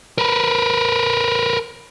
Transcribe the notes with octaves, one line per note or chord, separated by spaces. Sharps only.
A#4 B4